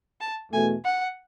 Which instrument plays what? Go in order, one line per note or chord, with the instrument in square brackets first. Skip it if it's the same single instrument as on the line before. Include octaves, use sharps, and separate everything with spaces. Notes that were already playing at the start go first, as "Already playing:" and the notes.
[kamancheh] A5
[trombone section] E2 B2 A3 [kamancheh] G#5
[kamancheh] F#5